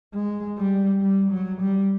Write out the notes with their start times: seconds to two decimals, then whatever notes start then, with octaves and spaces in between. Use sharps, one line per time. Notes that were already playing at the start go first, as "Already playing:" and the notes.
0.13 G#3
0.58 G3
1.01 G3
1.32 F#3
1.61 G3